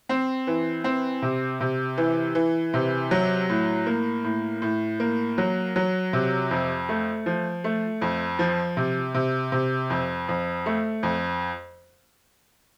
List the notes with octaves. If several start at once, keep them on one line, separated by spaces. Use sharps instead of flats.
C4
E3
C4
C3
C3
E3
E3
C3
F#3
A2
A#3
A2
A2
A#3
F#3
F#3
C3
F2
A3
F3
A3
F2
F3
C3
C3
C3
F2
F2
A3
F2